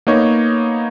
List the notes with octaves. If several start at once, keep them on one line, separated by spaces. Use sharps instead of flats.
A#3 B3 D#4 C#5